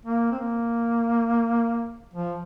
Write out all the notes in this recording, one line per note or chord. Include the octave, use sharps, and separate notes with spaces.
A#3
C4
A#3
F3